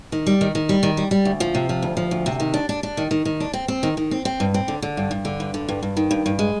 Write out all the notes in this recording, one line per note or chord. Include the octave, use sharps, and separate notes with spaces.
D#3
G3
D#3
D#3
G3
D#3
G3
G3
D2
F3
C3
F3
D2
F3
D2
C3
D#3
D4
D4
D4
D#3
D#3
D#3
D4
C4
C4
D#3
D#3
C4
C4
G2
C4
D3
D3
G2
G2
D3
G2
D3
G2
G2
D#3
G2
G2
G#3